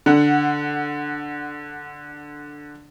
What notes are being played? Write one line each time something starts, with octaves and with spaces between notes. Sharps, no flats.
D3 F#5